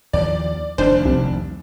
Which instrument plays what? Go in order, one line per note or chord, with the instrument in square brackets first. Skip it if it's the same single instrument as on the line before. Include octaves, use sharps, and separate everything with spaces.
[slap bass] D#2 F3 [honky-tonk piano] D5
[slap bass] F1 E2 D#3 [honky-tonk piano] D4 [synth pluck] C5
[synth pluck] C2